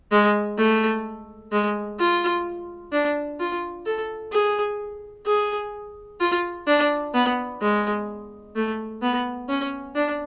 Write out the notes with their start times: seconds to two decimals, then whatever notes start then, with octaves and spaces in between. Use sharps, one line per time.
0.12 G#3
0.58 A3
1.52 G#3
2.00 F4
2.93 D4
3.40 F4
3.86 A4
4.33 G#4
5.27 G#4
6.21 F4
6.68 D4
7.14 B3
7.61 G#3
8.56 A3
9.02 B3
9.49 C#4
9.95 D4